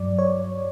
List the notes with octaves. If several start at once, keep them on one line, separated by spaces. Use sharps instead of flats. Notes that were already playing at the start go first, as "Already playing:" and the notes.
Already playing: G2 F#3 D5
C#5